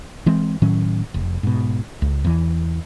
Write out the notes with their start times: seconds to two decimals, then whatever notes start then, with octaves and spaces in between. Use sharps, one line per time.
0.26 E3 G#3 C4
0.62 A2 D#3 F#3 C#4
1.14 F1
1.43 G#2 B2
2.02 C#2
2.24 E2 E3